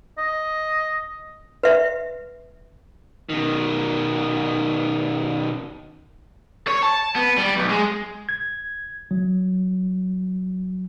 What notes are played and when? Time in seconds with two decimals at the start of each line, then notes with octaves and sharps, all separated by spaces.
0.18 D#5
1.63 B4 E5
3.29 B2 D#3
6.67 C#5
6.83 A5
7.16 B3
7.37 G3
7.57 B1
7.70 G#3
8.29 G#6
9.11 F#3